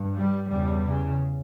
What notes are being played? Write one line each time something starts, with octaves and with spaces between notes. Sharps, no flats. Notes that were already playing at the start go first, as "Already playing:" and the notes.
Already playing: G2
G3
E2 C#3 G3
C#3